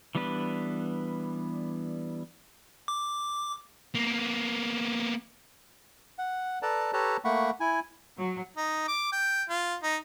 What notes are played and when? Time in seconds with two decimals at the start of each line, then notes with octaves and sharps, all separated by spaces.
0.15 E3 G3 B3 D4 B4
2.88 D6
3.95 A#3 B3
6.19 F#5
6.62 A4 B4 D5 A5 A#5
6.93 G4 A4 B4 C#5 A5 A#5
7.25 A3 A#3 F#5 B5 C#6
7.60 E4 G#5
8.17 F#3
8.57 D#4
8.88 D6
9.12 G5
9.49 F4
9.83 D#4